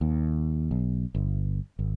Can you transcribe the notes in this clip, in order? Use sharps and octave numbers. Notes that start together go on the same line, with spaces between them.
D#2
B1
G1
G#1